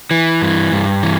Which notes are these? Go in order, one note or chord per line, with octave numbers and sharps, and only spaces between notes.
E3
G2
G2
E3